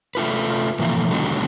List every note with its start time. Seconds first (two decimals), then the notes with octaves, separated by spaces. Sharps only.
0.15 A3 F4 B4
0.79 B2 E3 F3 A3 A#3
1.11 D3 D#3 F#3 G#3 B3 C4